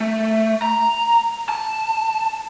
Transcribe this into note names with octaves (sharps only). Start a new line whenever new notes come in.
A3
A#5
A5